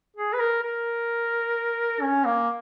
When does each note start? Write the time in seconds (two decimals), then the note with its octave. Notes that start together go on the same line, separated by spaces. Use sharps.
0.16 G#4
0.33 B4
0.40 A#4
0.63 A#4
2.01 C#4
2.25 A#3